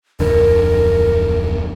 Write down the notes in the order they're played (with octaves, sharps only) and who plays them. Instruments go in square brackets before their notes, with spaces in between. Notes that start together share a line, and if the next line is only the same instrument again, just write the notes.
[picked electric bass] D1 F2 D3 [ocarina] A#4